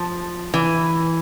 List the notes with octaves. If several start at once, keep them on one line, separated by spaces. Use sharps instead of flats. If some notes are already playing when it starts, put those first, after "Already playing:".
Already playing: F3
E3